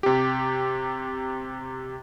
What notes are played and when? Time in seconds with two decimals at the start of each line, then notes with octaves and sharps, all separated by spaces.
0.03 C3 G4